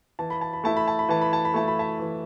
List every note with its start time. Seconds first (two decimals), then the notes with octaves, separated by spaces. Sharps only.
0.19 E3 A5
0.30 B5
0.41 A5
0.53 B5
0.64 A3 E4 A5
0.77 B5
0.88 A5
0.99 B5
1.09 E3 A5
1.21 B5
1.33 A5
1.45 B5
1.54 A3 E4 A5
1.68 B5
1.79 E5 A5
1.99 E3